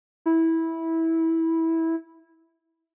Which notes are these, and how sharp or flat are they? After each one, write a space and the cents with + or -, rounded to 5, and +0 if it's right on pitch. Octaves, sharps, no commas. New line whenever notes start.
E4 -15